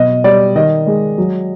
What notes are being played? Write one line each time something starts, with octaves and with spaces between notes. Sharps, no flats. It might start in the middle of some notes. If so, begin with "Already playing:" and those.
Already playing: B2 F#3 D#5
G3 D5
D#3 D#5
G#3
F#3